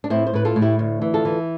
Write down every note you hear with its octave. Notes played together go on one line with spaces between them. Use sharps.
D4
A2 C4 E4
C5
A2 B4
F4 A4
A2
E4 G4
D2
E3
F4 A4
E3